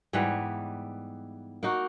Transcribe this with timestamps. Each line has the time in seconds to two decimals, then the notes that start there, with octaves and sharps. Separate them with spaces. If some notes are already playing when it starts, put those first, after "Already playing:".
0.13 G#2 E3 G3 B3
1.63 A#3 D#4 F#4